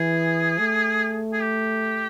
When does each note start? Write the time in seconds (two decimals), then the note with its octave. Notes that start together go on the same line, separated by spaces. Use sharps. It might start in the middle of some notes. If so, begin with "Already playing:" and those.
Already playing: E3 G#4
0.58 A3
1.32 G#4
1.41 G4